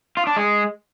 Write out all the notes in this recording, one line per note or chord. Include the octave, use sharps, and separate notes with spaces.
F4
D4
G#3